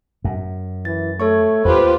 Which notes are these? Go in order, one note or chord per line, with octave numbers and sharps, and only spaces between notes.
F#2
E3 A6
A3 A4 C#5 C#6
D#2 F4 G4 B4 C5